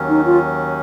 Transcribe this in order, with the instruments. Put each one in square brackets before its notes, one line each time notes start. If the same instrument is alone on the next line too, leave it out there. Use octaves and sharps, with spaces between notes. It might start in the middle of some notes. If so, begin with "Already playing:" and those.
Already playing: [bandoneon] D#2 D#3 F#3 C#4
[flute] D#4
F4